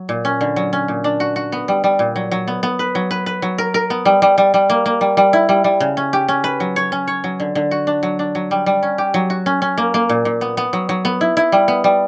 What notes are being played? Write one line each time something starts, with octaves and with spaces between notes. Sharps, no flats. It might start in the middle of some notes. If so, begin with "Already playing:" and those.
Already playing: F#3
A#2
C#4
D3
F#3
C#4
A#2
D4
F#4
F#4
B3
G3
G3
A#2
F#3
F#3
B3
B3
B4
F#3
B4
B4
F#3
A#4
A#4
B3
G3
G3
G3
G3
A#3
A#3
G3
G3
E4
G3
G3
C#3
C#4
G4
C#4
B4
F#3
C#5
C#4
C#5
F#3
D3
D3
F#4
D4
F#3
D4
F#3
G3
G3
C#4
G4
F#3
F#4
C#4
C#4
A#3
A#3
A#2
A#2
B3
B3
F#3
F#3
B3
E4
E4
G3
B3
G3